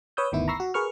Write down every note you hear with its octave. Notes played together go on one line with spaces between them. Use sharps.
B4 C#5 D#6 E6 G6
G1 D2 D#3 B3 E4
A#5 B5 C#6 E6 A#6 C7
F#4
G#4 A#4 B4 C#6 F6